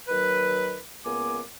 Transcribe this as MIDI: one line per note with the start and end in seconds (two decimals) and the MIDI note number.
0.08 0.78 39
0.08 0.78 51
0.08 0.78 54
0.08 0.78 71
1.05 1.40 37
1.05 1.40 58
1.05 1.40 59
1.05 1.40 80
1.05 1.40 86